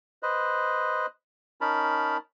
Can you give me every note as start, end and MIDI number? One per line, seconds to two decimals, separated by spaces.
0.23 1.06 71
0.23 1.06 72
0.23 1.06 75
1.61 2.17 61
1.61 2.17 63
1.61 2.17 70
1.61 2.17 81
1.61 2.17 83